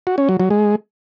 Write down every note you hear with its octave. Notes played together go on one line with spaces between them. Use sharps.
F#4
C#4
F#3
F#3
G#3